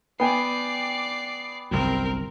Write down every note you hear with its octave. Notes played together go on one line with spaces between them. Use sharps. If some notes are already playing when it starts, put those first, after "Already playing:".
B3 D5 G5 G#5 C7
G1 C2 F#2 C4 A#4